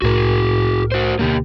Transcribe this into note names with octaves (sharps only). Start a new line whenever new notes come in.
C2 A2 F#4 G#4 A#4
F#4 C5
D2 B2 D3 A#3 G4